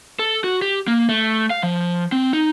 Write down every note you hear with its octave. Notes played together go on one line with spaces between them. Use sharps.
A4
F#4
G4
A#3
A3
F5
F3
C4
D#4